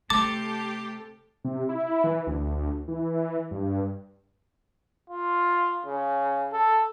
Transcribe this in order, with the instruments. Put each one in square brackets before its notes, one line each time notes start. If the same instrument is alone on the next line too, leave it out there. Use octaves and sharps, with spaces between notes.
[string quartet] C3 G4 [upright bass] A3 [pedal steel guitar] A4 A5 [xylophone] D6
[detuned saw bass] C3
E4
E3
D2
E3
G2
[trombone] F4
C#3
A4